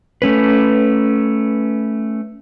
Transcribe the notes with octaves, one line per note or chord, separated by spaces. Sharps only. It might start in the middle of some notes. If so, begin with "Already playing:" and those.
A3 C#4 B4